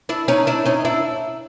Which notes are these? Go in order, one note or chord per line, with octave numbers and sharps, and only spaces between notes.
D4 E4
C#4 D#4
D4 E4
C#4 D#4
D4 E4